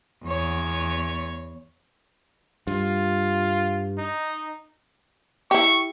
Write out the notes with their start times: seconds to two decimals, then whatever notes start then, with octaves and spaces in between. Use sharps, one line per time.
0.24 E2 C#5
2.67 G2 F4
3.98 D#4
5.51 E4 G4 C#6